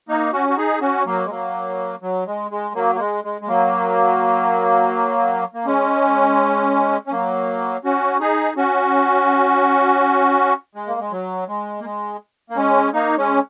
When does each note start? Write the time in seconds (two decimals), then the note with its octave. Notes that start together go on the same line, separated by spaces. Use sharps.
0.09 A#3 D#4
0.33 C#4 F#4
0.49 F#4
0.57 D#4 G#4
0.81 C#4 F#4
1.06 F#3 A#3
1.26 G#3
1.30 F#3 A#3
2.02 F#3
2.27 G#3
2.51 G#3
2.75 F#3 A#3
2.95 A#3
2.99 G#3
3.24 G#3
3.41 G#3
3.48 F#3 A#3
5.54 A#3
5.66 G#3 C#4
7.07 C#4
7.12 F#3 A#3
7.85 C#4 F#4
8.21 D#4 G#4
8.57 C#4 F#4
10.75 G#3
10.87 A#3
11.00 G#3
11.12 F#3
11.48 G#3
11.80 A#3
11.84 G#3
12.50 A#3
12.56 G#3 C#4
12.94 A#3 D#4
13.18 G#3 C#4